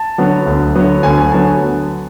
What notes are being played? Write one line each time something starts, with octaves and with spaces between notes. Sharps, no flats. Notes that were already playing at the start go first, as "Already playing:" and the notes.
Already playing: A5
D3 F#3 B3
D2
D3 F#3 B3
D2 G#5
G#5
D3 F#3 B3 A5